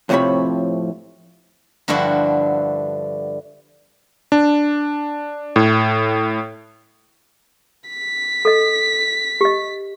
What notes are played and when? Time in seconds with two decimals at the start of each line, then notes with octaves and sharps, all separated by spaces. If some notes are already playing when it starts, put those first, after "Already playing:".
0.09 F2 A2 C3 F3 C#5 B5
1.88 G2 D3 F3 D4 E4 F#4
4.32 D4
5.56 A2
7.90 B6
8.45 A4 D#5
9.41 G4 D#5